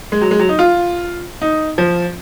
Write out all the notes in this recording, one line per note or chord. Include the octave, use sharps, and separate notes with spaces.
G#3
F#3
G#3
F#3
D#4
F4
D#4
F3